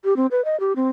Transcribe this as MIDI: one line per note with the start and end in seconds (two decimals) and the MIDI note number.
0.04 0.16 67
0.17 0.26 60
0.31 0.44 71
0.45 0.58 75
0.60 0.73 67
0.76 0.90 60